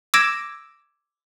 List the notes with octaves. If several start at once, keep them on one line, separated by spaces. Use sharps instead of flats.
D6 E6 G#6 A#6 D7 E7